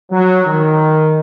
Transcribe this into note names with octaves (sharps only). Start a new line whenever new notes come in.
F#3
D#3